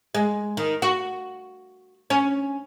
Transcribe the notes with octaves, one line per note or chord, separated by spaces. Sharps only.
G#3
D#3
F#4
C#4